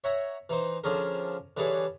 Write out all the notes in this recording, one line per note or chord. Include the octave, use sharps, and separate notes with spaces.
C#5 E5 F#5 A#5
E3 D#4 C5
D3 F3 C#4 G#4 A#4
D3 E3 G3 G#4 B4 C#5